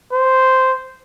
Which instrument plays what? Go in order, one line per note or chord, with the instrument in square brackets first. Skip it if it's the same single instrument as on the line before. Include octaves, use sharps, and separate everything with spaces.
[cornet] C5